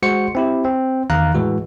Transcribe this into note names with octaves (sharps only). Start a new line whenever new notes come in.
G#3 F#4 C5 C#7
C4 E4 G4
C4
E2 D#3 F5 A#5 F#6
A2 E3 G#3 F#4